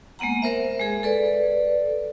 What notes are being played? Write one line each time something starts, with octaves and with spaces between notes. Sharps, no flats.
G#3 A#3 B3 F#5 A#5
A#4 C5 E5
G#3 G#4
A4 B4 D5